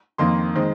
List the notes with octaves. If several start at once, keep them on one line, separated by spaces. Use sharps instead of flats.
F2 D#3 A#3 C6
D#3 G#3 C4